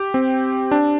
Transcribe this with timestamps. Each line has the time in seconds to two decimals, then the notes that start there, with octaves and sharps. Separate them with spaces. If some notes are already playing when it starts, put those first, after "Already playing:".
Already playing: G4
0.14 C4
0.71 D4